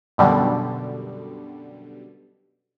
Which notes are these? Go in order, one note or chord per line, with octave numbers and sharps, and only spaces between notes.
F#2 B2 D3 G3